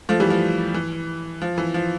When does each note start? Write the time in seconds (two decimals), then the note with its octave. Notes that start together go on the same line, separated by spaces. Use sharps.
0.09 F3 A3
0.20 E3 G3
0.30 F3
0.74 E3
1.42 F3
1.58 E3
1.74 F3